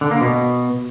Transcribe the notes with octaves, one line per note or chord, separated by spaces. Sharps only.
D3
A#3
B2